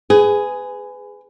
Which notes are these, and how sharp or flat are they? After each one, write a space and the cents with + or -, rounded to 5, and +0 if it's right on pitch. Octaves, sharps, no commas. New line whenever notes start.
G#4 +0 B4 +30